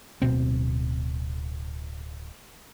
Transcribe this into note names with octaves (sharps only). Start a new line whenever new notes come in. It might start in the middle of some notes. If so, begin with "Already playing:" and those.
D1 B2 C4